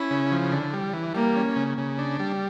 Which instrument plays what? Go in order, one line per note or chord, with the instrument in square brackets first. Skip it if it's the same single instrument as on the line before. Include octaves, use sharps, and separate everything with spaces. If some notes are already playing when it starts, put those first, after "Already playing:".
Already playing: [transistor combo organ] C#4 [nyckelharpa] E4
[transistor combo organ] C#3
F3
D3
G3
E3
[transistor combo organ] G3 [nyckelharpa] A#3
[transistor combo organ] C#4
C#3
C#3
D4
G3